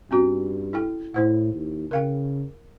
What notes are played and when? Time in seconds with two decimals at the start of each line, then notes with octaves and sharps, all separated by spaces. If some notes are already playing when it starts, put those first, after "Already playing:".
0.11 G2 C4 C#4 F#4
0.73 E4 A4 G5
1.14 A2 E4 C5 F#5
1.53 D#2
1.91 C#3 A#4 F5 G5